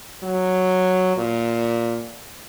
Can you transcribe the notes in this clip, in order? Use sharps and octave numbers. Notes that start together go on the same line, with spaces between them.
F#3
A#2